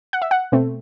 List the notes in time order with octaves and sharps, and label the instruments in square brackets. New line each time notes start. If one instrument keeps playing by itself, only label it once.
[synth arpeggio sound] F#5
E5
F#5
B2 A3 C4